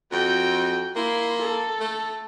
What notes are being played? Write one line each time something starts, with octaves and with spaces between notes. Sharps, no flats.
F2 F#4 G5
A#3 E4 C6
A4
A3